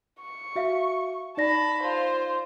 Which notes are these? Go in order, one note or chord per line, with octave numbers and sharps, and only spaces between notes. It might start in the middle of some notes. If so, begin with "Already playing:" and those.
C#6
F#4 E5 F5
D#4 D5 A5 B5 A#6
F4 C5 C6